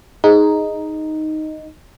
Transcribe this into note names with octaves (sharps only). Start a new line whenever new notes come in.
D#4 G#4